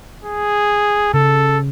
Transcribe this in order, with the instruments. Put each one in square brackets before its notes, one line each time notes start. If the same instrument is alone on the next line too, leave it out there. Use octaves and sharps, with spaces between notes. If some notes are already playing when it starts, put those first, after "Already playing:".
[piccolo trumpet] G#4
[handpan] C#3 [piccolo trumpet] A4